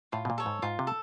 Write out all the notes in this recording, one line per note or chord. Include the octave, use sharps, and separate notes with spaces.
A2 F4
B2
A#2
A4 C#5
G#2
G#2 F4
C3
A4